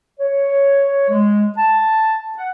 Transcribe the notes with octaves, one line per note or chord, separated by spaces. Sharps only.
C#5
G#3
A5
F#5